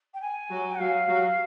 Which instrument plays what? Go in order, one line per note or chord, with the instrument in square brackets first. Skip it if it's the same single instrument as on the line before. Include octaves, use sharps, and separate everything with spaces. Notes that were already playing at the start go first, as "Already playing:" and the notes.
[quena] G5
G#5
[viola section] F#3 F#4
[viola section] F#3 F#4 [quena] F5
[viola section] F#3 F#4